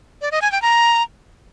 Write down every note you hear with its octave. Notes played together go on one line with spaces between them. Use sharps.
D5
D#5
G#5
G5
A#5